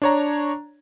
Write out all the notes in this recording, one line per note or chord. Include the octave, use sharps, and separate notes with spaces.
D4 C#5 A#5